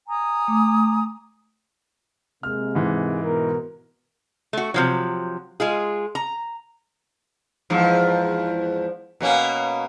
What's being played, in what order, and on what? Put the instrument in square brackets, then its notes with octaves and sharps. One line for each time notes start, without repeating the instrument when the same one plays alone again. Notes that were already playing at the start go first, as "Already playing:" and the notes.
[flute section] G#5 A#5 D#6
[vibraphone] A3 D6
[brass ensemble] C3 G#3 A#3 [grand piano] F6
[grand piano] G#2 E3
[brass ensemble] B2 A#4
[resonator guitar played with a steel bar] A3 F#4
C3 F3 F#3
G#3 F4 G#4
A#5
[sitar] E2 G#2 F3
B2 A#3 C#4